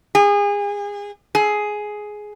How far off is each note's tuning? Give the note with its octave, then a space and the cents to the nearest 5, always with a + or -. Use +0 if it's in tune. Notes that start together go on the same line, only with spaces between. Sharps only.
G#4 -30
G#4 +10